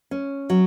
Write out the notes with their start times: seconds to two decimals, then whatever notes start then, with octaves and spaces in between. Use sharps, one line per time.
0.11 C#4
0.50 F#3